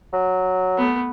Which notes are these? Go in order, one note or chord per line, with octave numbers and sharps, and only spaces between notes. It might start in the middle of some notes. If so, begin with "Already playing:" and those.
F#3
A3 B3